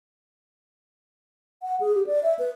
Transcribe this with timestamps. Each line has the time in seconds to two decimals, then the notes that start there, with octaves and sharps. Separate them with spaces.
1.62 F#5
1.80 G#4
1.95 G4
2.06 D5
2.23 E5
2.39 B4